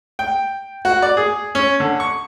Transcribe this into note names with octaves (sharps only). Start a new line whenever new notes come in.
G5
F#4
D5
G#4
C#4
D3
C#6